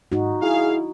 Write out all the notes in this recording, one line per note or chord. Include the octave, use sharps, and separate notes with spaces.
G#2 D#4 F#4
E4 G#4 F5